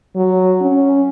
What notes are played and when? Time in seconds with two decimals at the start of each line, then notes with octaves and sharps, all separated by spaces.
0.16 F#3
0.61 C#4